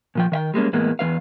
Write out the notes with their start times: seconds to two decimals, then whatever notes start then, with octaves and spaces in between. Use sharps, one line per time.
0.15 A#2 F3 G5
0.32 D#3 E5 G5
0.54 G3 G#3 A#3 C#4
0.73 E2 A2 G#3 A#3 B3
0.99 E2 G#3 B4 F5